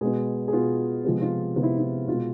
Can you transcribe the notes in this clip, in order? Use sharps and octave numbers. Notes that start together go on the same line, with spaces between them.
B2 G#3 B3 G#4
G#4
B2 B3 F4
C3 F3 G#3 B3
F4
C3 F3 G#3 B3 F4
E4
E4
B2 G#3 B3 F4